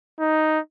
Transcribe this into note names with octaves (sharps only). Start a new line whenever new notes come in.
D#4